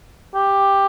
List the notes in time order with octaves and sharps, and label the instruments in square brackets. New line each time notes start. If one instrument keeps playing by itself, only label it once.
[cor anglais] G4